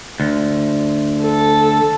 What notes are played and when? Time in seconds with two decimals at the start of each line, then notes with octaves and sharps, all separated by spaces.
0.20 D2
1.23 A4